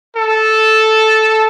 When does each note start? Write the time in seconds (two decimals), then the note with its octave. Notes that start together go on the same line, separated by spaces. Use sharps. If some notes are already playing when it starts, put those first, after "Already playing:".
0.16 A4